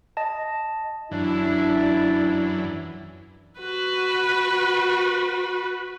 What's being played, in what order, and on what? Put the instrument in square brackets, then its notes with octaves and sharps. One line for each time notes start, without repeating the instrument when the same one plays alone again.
[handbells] D#5 A5
[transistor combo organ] F#2 E3 [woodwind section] D4 [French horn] E4
[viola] F#4 B4